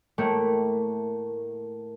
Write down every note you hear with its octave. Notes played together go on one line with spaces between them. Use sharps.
A2 A3 A#3